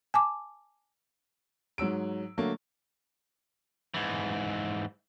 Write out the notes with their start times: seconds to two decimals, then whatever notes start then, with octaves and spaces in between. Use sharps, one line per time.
0.14 G#5 A5 D6
1.78 G#2 F#3 E6 D7
2.37 D3 F#3 A3 A#3
3.94 G#2 E3